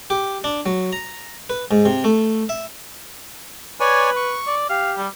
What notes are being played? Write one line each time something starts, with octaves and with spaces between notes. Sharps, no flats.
G4
D4
F#3
A#5
B4
G#2
C3
A3
E5
B4 C#5 D5 G#5
C#6
D5
G4 F5
G3